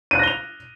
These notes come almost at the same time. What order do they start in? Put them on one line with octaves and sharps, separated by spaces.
D#7 F#6 A#6 G7 F7